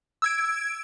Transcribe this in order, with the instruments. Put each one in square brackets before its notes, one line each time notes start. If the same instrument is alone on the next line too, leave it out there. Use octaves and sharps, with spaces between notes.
[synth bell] E6 G#6 D7